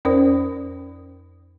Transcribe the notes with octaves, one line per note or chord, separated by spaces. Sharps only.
F2 C#4 A#4 C5 D5 D#6